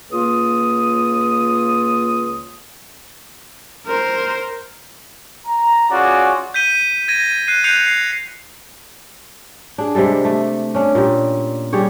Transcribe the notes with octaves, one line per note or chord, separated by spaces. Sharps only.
C#2 A#3 F4 D#6
A#4 C5
A#5
C#4 F4 F#4 G#4 D5
G6 B6 D#7 G7
G#6 A#6 D#7
F#6 C7 D#7
F#6 G6 C7 C#7 F7
C7
D4 G#4
C3 G3 G#3 A4
A3
C#4 D4
A#2 G4
G3 G4 G#4 C#5